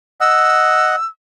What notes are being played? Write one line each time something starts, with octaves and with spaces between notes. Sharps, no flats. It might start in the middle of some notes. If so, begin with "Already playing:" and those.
D#5 F#5 E6